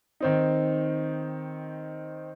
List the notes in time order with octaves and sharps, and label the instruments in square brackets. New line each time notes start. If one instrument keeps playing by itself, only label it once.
[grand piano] D#3 C4 D#4